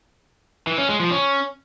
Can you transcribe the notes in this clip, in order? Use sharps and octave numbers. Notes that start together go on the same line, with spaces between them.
E3
C#4
G#3
F3
C#4